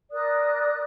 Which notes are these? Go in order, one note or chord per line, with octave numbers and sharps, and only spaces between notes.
A#4 D5 D#6 F#6